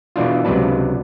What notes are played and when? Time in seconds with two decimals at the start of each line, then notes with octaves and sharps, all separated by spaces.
0.16 B2 E3 D4 F4
0.45 C#2 C3 F#3 D4 B4 A5